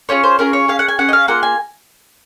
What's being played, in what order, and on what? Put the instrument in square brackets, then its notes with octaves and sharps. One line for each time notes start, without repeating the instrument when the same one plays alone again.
[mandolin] C#4 F4 G#4 C#5
C5
C#4 F4 G#4 A#4
C#5
C#4 G#4 F5
F#5
G#5
C#4 G#4 F#5
D#5
F5
A#3 F4 G#4 F#5
G#5